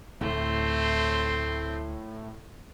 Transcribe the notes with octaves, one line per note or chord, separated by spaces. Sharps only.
D2 A2 A3 C4 C6